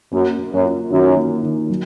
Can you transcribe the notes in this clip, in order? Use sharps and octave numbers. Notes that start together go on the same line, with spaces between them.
F#2 A#3
A#3
F#2
F4
F#2 D#3
A#3
D#3
F#3